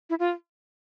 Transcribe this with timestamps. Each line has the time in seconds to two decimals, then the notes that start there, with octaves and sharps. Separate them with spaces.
0.10 E4
0.19 F4